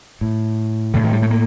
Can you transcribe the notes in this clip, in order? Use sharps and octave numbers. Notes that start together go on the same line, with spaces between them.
A2
A2 D3
D#3
G3
A3
A#3